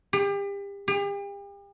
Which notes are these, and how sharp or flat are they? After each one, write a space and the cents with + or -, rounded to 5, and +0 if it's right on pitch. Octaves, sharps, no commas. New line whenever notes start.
G4 +35
G4 +40